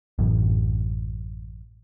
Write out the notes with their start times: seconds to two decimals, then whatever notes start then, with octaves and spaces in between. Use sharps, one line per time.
0.19 A1 F#2